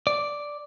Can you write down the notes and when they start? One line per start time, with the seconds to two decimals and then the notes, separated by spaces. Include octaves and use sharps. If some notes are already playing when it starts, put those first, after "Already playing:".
0.07 D5